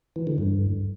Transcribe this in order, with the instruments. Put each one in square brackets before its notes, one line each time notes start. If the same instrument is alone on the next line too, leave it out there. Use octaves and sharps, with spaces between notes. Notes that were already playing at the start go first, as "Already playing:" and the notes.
[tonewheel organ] E3
D3
G2